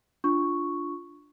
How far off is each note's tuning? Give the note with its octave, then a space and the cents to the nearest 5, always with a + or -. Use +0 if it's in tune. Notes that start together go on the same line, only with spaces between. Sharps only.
D4 +0 F4 +0 C#6 +0